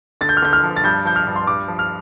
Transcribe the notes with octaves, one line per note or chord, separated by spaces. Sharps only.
D3 A6
G6
F6
D3 G6
F6
F3
A6
G2 G6
F3 G6
F6
G2
C6
G2 D6
F3
F6